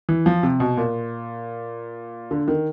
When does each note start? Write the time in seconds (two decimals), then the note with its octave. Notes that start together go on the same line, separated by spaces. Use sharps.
0.09 E3
0.26 F3
0.43 C3
0.60 B2
0.77 A#2
2.31 D3
2.48 D#3